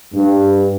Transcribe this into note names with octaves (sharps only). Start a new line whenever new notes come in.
G2